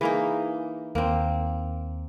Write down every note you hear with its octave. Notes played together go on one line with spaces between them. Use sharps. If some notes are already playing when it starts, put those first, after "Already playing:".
E3 A#3 D#4 G#4
D#2 A#3 C4